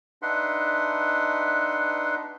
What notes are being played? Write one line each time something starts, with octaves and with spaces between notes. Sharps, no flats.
D4 D#4 B4 E5 F#5 C6